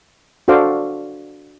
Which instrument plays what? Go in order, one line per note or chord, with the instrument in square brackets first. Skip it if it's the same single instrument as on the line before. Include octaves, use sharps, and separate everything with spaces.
[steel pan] D4 F#4 A4 C5 F5 D6